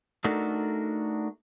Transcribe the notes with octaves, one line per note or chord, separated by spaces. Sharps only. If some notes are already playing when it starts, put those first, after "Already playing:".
A3 D4 D#4 F#4 A4 A#4